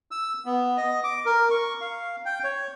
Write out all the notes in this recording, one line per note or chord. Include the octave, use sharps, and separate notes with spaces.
E6
B3
D#5
D6
A#4
C#6
F5
G5
C#5